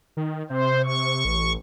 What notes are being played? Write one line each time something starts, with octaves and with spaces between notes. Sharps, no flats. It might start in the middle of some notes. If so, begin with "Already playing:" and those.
D#3
C3 C5
C#6
A1